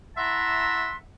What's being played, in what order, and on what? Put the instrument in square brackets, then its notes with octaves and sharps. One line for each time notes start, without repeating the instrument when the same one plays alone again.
[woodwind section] E4 E5 F#5 A5 A#5 C6